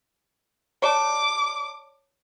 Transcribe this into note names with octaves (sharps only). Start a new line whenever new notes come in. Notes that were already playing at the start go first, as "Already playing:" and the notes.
C#5 D5 A5 D6